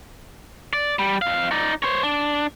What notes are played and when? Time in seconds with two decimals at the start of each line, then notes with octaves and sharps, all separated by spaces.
0.73 D5
0.99 G3
1.22 F2 F5
1.51 D#4 D5
1.83 C5 C#5
2.03 D4